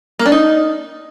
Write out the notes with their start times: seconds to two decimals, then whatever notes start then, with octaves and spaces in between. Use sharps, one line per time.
0.19 A#3
0.26 D4
0.32 D#4